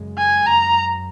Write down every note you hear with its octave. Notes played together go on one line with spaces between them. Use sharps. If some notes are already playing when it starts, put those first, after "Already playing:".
Already playing: F#2 C#3 G#3
G#5
F#2 A#5